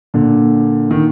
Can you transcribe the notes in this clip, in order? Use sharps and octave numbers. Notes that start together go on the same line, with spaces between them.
A#2 D3
D#3